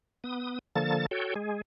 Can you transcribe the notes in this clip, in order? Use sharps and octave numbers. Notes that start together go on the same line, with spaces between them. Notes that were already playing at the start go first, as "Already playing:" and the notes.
B3 D#6
D3 F3 A#3 A4 A6
F#4 A4 C#5 G5
G#3 G#4